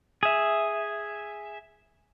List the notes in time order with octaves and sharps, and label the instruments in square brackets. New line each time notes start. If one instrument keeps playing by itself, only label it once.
[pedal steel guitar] G#4 E5